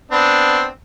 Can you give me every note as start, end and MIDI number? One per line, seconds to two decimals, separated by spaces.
0.12 0.66 59
0.12 0.66 60
0.12 0.66 62